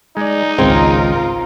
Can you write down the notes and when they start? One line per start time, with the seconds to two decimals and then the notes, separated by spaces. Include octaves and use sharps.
0.17 G#3 D#4 D5
0.58 G#1 C#2 C4 F4 G#4 A#4